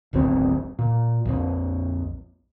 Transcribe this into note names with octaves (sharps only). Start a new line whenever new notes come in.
D1 G#1 F#2 C4
A#2
A#1 F2